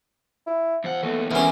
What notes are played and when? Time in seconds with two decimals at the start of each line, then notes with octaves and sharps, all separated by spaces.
0.47 E4
0.84 E2 F3 F#5
1.03 D#2 A3 B3
1.31 E2 D3 A#3 C#4 E4